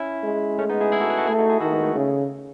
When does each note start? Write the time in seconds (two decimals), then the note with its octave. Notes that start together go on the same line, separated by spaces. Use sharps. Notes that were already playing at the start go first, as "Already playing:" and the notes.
Already playing: C#4 E4
0.24 G#3
0.59 A3 C#4
0.69 B3 D#4
0.81 E4 G#4
0.92 E4 G#4
1.00 F#4 A4
1.10 G#4 B4
1.18 F#4 A4
1.26 A3 E4 G#4
1.39 D#4 F#4
1.50 E4 G#4
1.60 D#3 F#4 A4
1.72 G#3 B3
1.83 A3
1.96 C#3